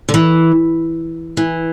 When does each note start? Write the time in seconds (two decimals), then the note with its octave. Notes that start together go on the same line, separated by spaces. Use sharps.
0.09 D3
0.14 E3
1.37 E3